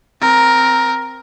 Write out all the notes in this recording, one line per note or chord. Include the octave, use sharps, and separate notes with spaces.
C4 A#4